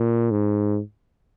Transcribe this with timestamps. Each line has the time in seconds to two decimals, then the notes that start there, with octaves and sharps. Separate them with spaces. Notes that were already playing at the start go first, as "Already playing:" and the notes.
Already playing: A#2
0.31 G#2